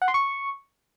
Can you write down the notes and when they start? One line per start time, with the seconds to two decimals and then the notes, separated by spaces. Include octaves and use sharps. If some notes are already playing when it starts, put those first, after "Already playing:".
0.02 F#5
0.08 C6
0.14 C#6